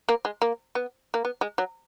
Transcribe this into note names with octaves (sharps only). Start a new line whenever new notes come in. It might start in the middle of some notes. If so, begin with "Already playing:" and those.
A#3
G#3
A#3
B3
A#3
B3
G#3
F#3